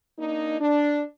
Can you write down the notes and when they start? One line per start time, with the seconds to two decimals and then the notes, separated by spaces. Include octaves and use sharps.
0.19 A#3 D4 D#4
0.61 D4